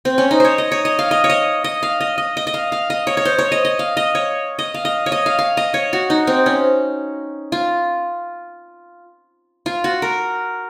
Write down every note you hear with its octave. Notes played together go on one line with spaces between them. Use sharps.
C4
C#4
D#4
C5 C#5
D#5
C#5
D#5
F5
D#5
C#5
D#5
D#5
F5
D#5
D#5
D#5
D#5
F5
F5
D#5
C#5
C#5
C5
C#5
D#5
D#5
F5
D#5
C#5
D#5
F5
D#5
C#5
D#5
F5
F5
D#5
C#5
F#4
D#4
C4
C#4
F4
F4
F#4
A#4